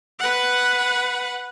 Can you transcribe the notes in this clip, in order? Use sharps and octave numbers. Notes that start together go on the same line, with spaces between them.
B4 F#5